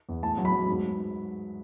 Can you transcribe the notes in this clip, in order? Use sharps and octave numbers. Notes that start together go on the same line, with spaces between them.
E2
A2 A5
F#3
B5
F#3
G#2